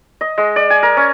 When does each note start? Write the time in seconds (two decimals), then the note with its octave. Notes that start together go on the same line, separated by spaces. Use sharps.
0.21 D#5
0.38 G#3
0.56 D5
0.70 G#5
0.83 A#4
0.97 C#4